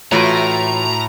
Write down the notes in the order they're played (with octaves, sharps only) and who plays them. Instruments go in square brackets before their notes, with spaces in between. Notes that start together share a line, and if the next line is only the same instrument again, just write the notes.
[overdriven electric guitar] A2 [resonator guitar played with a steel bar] E3 F4 C#5 [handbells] A3 F#4 [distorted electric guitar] A#5